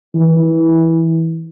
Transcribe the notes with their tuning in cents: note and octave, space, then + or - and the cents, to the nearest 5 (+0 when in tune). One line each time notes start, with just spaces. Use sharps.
E3 -15